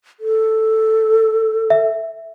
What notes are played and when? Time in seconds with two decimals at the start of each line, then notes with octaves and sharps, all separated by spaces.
0.20 A4
1.70 E5